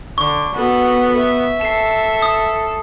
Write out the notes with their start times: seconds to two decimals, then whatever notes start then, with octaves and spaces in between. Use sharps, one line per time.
0.18 D3 C#6
0.55 B3 F#4 A4
1.17 E5
1.61 A4 C7 E7
2.22 D#6